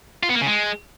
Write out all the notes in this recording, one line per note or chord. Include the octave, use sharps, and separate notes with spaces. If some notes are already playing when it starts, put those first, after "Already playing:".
F4
B3
A#3
C#3
G#3